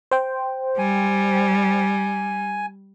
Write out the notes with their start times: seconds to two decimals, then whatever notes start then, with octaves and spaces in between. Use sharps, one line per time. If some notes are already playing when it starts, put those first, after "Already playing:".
0.11 C5 G5
0.78 G3 G#5